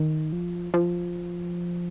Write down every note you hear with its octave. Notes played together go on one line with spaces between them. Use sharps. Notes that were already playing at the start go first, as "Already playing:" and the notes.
Already playing: D#3
F3
F3